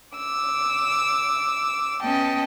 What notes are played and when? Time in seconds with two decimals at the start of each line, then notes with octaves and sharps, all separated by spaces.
0.16 D6 E6
2.01 B3 C#4 D#5 G5 A5